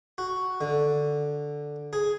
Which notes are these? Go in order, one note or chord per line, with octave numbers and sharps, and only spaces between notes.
F#4
D3
G#4